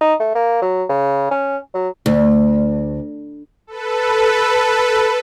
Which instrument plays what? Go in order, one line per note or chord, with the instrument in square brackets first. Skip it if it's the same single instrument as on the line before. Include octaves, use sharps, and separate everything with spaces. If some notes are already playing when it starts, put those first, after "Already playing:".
[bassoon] D#4
A3
A#3
F#3
C#3
C#4
F#3
[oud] D2
[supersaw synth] A4 B4